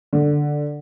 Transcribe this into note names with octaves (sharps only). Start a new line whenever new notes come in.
D3